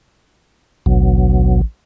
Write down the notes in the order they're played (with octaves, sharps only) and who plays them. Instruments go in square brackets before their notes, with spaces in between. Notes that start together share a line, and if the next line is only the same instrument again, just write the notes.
[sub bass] A1 [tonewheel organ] D2 B2 F#3